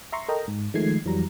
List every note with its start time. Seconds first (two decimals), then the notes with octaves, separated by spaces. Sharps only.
0.12 E5 A#5 C6 C#6
0.29 A4 A#4 D#5 G5 A#5
0.48 G#2
0.74 D#3 F3 G#3 A3 G#6 C7
1.05 F2 E3 F#3 G3 A#5